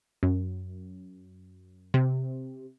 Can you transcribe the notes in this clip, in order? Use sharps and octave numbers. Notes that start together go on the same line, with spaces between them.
F#2
C3